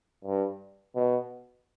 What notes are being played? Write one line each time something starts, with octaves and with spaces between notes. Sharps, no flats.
G2
B2